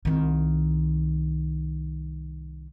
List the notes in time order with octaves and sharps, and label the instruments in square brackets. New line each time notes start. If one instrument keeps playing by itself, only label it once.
[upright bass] C2 D#3